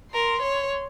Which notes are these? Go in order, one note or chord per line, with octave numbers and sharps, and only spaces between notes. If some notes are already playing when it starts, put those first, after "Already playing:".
A#4 C6
C#5